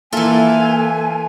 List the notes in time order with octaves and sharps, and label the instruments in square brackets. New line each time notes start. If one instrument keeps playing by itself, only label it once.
[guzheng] E3 F4 [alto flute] A#3 [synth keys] A4 E5 [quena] G#5